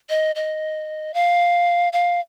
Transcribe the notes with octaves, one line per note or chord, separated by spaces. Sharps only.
D#5
D#5
F5
F5